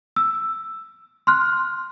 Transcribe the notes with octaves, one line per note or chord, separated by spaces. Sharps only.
E6
C6 F6 F#6